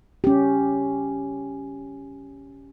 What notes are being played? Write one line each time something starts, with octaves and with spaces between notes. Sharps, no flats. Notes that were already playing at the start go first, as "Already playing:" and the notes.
C#4 G4